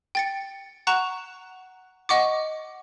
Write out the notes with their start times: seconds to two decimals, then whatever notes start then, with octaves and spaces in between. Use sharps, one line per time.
0.15 G5 A6 C#7
0.87 F#5 A#5 C#6 F#6 E7
2.09 D#5 F#5 C#6 D6